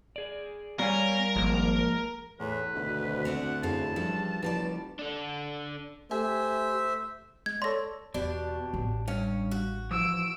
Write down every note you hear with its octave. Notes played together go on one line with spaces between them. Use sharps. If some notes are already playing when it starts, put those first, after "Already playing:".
G#4 D5
G3 B3 A#4 C#5 F5 G#5
G#1 F3 G#3 A#3
E2 A2 B4
G#1 D2 B2
C4 D4 F#4 F#5
A1 F#2 C4 E4 G#4 F5 A5
G2 F3 A4
F#1 F3 G3 B4 D5
D4 A4
A3 G4 C5 E5 G#5
G#3 G#6
A4 C#5 D5 C6 A#6
E2 B2 D4 G4
A1
G2 C#4 F5
F#4
E3 F3 E6 D7